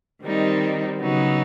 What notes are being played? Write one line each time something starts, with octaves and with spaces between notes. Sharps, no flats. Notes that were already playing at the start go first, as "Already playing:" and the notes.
D#3 G3 C4 D#4
C#3 F#3 B3 D#4